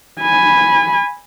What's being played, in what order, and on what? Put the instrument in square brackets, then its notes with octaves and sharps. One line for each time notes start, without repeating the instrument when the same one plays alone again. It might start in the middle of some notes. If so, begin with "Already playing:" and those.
[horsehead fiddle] G#5 B5